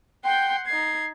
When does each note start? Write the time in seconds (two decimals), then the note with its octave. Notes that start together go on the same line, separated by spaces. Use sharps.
0.24 F#5 G5 C6 G6
0.66 D#4 G#6 C7